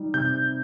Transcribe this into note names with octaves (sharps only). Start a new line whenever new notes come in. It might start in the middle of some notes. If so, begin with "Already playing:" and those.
Already playing: G3 D#4
C3 G6